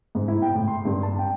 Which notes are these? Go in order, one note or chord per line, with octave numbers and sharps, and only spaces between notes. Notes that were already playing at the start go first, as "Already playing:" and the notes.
G#2
E4
G5
A2
C6
G2
A5
G5